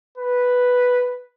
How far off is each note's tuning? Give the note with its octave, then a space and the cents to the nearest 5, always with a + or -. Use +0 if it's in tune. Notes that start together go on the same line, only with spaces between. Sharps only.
B4 +0